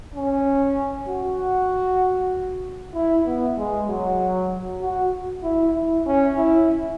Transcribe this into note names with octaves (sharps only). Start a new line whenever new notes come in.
C#4
F#4
E4
B3
G#3
F#3
F#4
E4
E4
C#4
E4